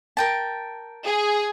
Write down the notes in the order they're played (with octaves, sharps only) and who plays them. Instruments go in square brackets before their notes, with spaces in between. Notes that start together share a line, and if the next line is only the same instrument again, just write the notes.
[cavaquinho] A#4 G5 A5
[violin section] G#4